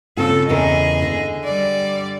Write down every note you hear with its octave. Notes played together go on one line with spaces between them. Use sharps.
C#3 C4 F4 A4
E2 C#3 G#4 A#4 D#5
D3
G3 D5